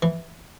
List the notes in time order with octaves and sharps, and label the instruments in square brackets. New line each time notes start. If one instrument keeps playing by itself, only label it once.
[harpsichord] E3